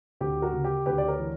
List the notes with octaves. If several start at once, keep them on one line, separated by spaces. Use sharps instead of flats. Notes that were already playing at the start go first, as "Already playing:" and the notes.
D2 G4
F#4 A#4
C#3
G4
D2 G4 B4
D5
A#4 C#5
E3